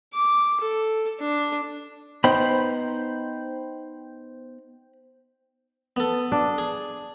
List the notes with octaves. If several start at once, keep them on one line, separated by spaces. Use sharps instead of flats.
D6
A4
D4
B3 D#4 C5 G5 B5
B3 A4
D4
G#4